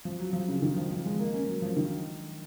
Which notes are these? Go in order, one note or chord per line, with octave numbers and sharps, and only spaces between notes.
F3
F#3
F3
C#3
D#3
F3
F3
G#3
A#3
C#4
F#3
F3
D#3